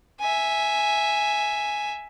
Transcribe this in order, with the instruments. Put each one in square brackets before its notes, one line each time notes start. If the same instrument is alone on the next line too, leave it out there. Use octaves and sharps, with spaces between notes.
[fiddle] E5 G#5